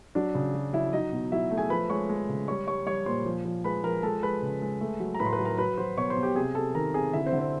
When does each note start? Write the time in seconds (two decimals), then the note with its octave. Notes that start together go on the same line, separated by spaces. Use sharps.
0.15 F#3 D4 D5
0.35 C#3
0.54 F#3
0.73 F#3 E4 E5
0.93 F#3 D#4 D#5
1.12 B2
1.32 F#3 E4 E5
1.51 A3
1.57 G#4 G#5
1.70 F3 B4 B5
1.90 G#3 C#5 C#6
2.09 G#3
2.29 C#3
2.48 G3 C#5 C#6
2.67 G3 C#5 C#6
2.86 G3 C#5 C#6
3.06 A#2 C5 C6
3.26 F3
3.45 F3
3.64 G#3 B4 B5
3.84 F3 A#4 A#5
4.03 G#3 A4 A5
4.23 G#3 B4 B5
4.42 C#3
4.62 G#3
4.81 A3
5.00 F#3
5.15 A#5
5.19 A2 B4 B5
5.26 C6
5.32 B4 B5
5.39 F#3
5.45 A#4 A#5
5.58 F#3 B4 B5
5.77 F#3 C5 C6
5.97 B2 C#5 C#6
6.10 C5 C6
6.16 B2
6.23 G4 G5
6.36 C3 G#4 G#5
6.55 C3 A4 A5
6.74 D#3 A#4 A#5
6.94 C3 G#4 G#5
7.13 D3 E4 E5
7.26 C4 C5
7.33 D3
7.39 C4 C5